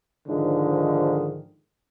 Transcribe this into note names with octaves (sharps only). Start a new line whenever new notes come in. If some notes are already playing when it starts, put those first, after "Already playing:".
G#2 D3 D#3 F3